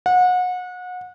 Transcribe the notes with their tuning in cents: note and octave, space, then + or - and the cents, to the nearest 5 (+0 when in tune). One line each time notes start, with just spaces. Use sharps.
F#5 -30